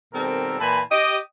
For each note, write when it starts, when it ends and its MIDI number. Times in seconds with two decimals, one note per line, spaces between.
0.13 0.59 47
0.13 0.59 51
0.13 0.59 55
0.13 0.59 60
0.13 0.59 69
0.13 0.59 70
0.60 0.81 46
0.60 0.81 52
0.60 0.81 80
0.60 0.81 81
0.60 0.81 83
0.91 1.16 67
0.91 1.16 75